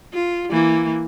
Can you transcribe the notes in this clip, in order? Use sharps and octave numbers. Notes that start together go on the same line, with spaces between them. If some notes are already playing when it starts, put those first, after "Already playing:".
F4
E3 A#3